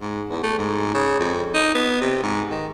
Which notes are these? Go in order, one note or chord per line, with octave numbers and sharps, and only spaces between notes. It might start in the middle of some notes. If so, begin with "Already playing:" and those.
G#2
E2
A3
G#2
C#3
F2
D#4
B3
C3
G#2
D#3